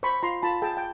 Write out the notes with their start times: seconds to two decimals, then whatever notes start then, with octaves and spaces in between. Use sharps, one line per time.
0.03 C5 B5 C#6
0.23 F4 A#5 C6
0.42 F4 A5 B5
0.62 G#4 G5 A5
0.77 G5